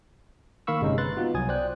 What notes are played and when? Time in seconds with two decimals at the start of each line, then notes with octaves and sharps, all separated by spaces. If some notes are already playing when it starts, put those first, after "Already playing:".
0.67 D#3 A#3 F5 B5 C#6 E6
0.81 G1 C3 G#3 C#4 D#4
0.98 B4 C6 F#6 A6
1.17 B3 D#4 F4 F#4
1.34 C2 F#3 G#5 D#6 G#6
1.49 C5 D5 G5 F#6